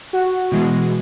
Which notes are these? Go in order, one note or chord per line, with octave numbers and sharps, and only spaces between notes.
F#4
B2 E3 G#3